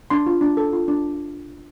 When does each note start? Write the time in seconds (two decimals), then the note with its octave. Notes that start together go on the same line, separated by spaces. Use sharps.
0.10 D4 C6
0.27 F4
0.41 D4
0.57 A4
0.73 F4
0.88 D4